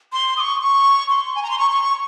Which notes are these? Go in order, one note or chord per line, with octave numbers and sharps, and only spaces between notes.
C6
D#6
C#6
C#6
C6
G#5
A#5
C6
C#6
C#6
C#6